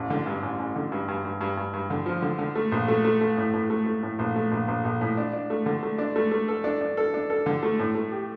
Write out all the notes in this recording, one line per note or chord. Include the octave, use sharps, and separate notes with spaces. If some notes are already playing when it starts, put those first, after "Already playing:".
Already playing: A1
D3
G2
A1
A1
D3
G2
G2
G2
G2
G2
G2
D3
F3
D3
D3
A3
A#1
A3
A3
A3
A2
A2
A3
A3
A2
A#1
A3
A#1
A#1
A#1
A2
D4
D4
A3
D3
A3
D4
A3
A3
A4
D4
D4
A4
D4
A4
D3
A3
A2
A3
G4